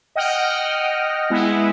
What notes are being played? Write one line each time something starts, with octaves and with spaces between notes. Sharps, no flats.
D#5 F#5 G5 F6
G#3 B3 E4